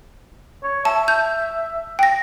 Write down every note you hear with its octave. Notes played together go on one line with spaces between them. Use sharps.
C#5
E5 A5
G6
G5 A#6